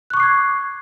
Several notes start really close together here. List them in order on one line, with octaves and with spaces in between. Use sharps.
F#6 C#6 D6 C7 G#6